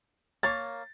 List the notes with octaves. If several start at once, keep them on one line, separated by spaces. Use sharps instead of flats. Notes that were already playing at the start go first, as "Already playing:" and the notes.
A#3 C#5 A5 A6